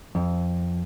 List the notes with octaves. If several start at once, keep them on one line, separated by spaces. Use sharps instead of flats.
F2